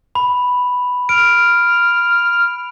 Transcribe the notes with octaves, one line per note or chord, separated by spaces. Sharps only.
B5
F6 D7